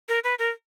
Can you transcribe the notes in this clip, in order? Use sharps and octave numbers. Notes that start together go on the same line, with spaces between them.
A#4
B4
A#4